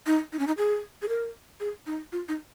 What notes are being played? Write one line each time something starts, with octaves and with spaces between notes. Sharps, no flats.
D#4
D#4
C#4
D#4
G#4
G#4
A#4
G#4
D#4
F4
D#4